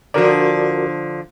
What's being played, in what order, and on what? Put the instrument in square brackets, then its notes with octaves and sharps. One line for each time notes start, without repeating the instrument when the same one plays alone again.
[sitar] D3 F3 [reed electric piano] F#4 A#4 D5